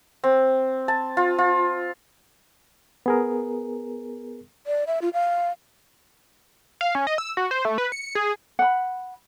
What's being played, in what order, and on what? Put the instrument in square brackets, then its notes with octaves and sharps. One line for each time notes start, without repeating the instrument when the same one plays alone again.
[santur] C4
A5
F4
F4
[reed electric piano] B3 G#4 A#4
[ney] D5
E5
F4
F5
[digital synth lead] F5
C#4
D#5
E6
F#4
C5
A3
B4
C#7
G#4
[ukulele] F#5 B5